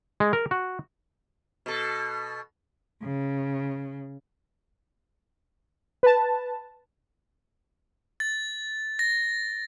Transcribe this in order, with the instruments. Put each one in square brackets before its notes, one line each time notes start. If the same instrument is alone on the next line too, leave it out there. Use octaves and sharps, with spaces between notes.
[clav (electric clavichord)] G#3
A#4
F#4
[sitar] B2 A4
[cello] C#3
[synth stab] B4 A5
[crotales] A6
A#6